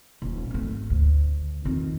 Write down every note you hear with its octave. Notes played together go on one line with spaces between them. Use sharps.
D#1
G#1 A3
D2
F2 D#3